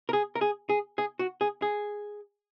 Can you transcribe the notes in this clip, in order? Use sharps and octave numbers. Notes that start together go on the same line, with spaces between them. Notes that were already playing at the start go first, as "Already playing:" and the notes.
A#4
G#4
A#4
G#4
G#4
G#4
F#4
G#4
G#4